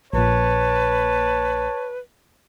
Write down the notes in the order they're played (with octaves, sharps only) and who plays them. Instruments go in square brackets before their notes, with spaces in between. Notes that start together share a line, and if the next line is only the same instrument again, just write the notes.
[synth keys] A#1 A#2 [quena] B4 [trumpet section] C#5 A5